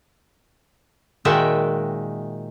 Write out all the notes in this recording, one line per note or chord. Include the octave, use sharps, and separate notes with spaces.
A#2 D#3 G#3 F#4 E5 G5